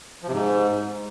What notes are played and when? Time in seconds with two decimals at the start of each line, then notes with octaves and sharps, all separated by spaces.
0.22 F3
0.28 C3
0.33 G#2